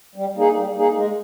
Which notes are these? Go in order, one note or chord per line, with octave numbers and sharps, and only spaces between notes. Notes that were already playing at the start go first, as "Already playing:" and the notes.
G3
A#3 D#4 G#4
G3
A#3 D#4 G#4
G#3